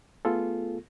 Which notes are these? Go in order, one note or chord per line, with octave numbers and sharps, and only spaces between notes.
A3 B3 F4 G#4 A4